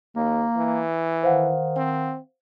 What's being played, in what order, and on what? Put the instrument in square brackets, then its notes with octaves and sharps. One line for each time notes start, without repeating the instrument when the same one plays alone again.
[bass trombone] D#2 [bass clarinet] A#3
[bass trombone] E3
[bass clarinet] D#3 [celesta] C5 F5 F#5
[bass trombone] C4